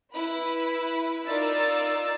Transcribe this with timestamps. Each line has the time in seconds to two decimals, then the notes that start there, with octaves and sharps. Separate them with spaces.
0.13 E4 B4 B5
1.27 D#4 F4 A#4 D5 E6 A6